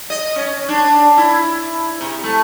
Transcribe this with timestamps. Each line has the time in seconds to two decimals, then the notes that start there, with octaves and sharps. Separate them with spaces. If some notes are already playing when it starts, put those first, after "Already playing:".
0.10 D#5
0.36 C#4
0.69 D4
1.18 E4
2.01 C3
2.24 A3